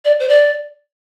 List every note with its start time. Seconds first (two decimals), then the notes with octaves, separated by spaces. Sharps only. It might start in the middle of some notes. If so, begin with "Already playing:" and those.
0.05 D5
0.20 C5
0.28 D5